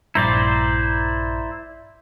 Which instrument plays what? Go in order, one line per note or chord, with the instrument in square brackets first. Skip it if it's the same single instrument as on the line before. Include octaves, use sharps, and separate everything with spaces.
[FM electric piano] A#1 G2 A#5 [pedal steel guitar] E4 C5 D5